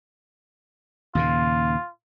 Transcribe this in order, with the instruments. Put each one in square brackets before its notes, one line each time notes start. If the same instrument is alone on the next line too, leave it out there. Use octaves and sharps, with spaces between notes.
[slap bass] D#2 A#2 C#3 [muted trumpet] F4